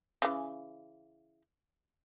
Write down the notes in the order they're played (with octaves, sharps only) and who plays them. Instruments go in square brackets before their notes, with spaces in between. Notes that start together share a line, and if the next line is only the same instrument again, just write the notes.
[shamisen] C#3 E3